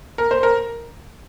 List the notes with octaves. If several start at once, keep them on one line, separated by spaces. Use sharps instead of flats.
A#4
C5
A#4